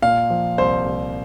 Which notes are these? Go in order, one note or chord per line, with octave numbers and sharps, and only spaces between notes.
A#2 F5
F3
C2 C5
C2